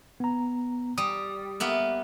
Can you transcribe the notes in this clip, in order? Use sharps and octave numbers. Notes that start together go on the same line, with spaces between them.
B3 A#5
G3 D#6
A#3 B3 E5